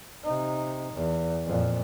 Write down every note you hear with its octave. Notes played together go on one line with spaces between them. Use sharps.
C3 D#4
E2
F2 A#2